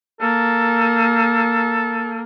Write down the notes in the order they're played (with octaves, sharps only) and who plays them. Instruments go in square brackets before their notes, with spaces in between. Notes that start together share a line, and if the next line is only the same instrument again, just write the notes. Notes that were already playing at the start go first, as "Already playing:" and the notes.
[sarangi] A#3 [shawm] A4